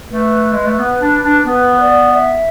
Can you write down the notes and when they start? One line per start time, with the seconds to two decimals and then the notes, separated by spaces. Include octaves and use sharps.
0.11 A3 B4
0.53 G#3
0.66 A3
0.79 B3
1.01 D4
1.24 D4
1.46 B3 B4
1.81 D5
2.15 E5